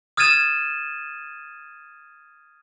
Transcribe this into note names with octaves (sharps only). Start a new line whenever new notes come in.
D#6 F6 G#6 A6 D#7 E7